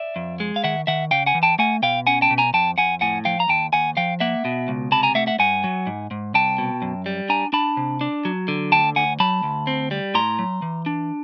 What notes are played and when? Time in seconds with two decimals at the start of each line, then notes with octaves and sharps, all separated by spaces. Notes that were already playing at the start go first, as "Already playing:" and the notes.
Already playing: D5 E5
0.16 F2
0.40 G#3
0.56 F5
0.64 D#3 E5 F#5
0.87 D#3 E5 F#5
1.11 C#3 F5 G5
1.26 F#5 G#5
1.35 E3
1.43 G5 A5
1.59 A3 F#5 G#5
1.82 B2 F5 G5
2.07 C#4 F#5 G#5
2.22 G5 A5
2.31 B2
2.38 G#5 A#5
2.53 F2 G5 A5
2.78 F2 F#5 G#5
3.01 A2 F#5 G#5
3.25 F3 F5 G5
3.40 A#5
3.48 D#2 G5 A5
3.73 D#2 F#5 G#5
3.97 F3 F5 G5
4.20 A#3 E5 F#5
4.45 B2
4.68 C#2
4.92 C3 A5 B5
5.03 G#5 A#5
5.15 A3 E5 F#5
5.27 E5 F#5
5.39 G2 F#5 G#5
5.64 F#3
5.87 G#2
6.11 G#2
6.34 C2 G5 A5
6.58 B2
6.82 F#2
7.06 G3
7.29 D4 G#5 A#5
7.53 D4 A5 B5
7.77 C3
8.01 D4
8.25 F#3
8.48 D3
8.72 D2 G5 A5
8.96 D2 F#5 G#5
9.20 F#3 A5 B5
9.43 D2
9.67 C4
9.91 G3
10.14 A2 A#5 C6
10.39 F#3
10.62 E3
10.86 D4